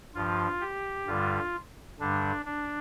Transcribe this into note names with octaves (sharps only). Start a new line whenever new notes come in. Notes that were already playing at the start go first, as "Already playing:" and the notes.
G2 F3 F4
G4
G2 D3 G3 F4
G2 D3 G3 D4
D4